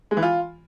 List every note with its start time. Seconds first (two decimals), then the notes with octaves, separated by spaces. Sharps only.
0.11 G#3
0.17 E3
0.22 F4